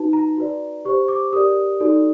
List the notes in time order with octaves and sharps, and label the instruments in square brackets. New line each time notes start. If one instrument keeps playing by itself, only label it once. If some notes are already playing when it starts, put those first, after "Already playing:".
Already playing: [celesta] D#4 F#4 B4 A5
A#5
F#4 B4 D5
G4 C5 C#6
D6
G4 A#4 D5 D#6
D#4 F#4 A4 D5